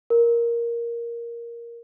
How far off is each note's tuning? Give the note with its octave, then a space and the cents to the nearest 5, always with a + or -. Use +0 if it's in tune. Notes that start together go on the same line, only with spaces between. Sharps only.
A#4 +5